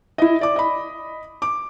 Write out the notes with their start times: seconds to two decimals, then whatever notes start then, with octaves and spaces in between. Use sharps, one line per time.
0.18 E4 D#5
0.41 D5 D6
0.56 D#5 B5
1.42 D6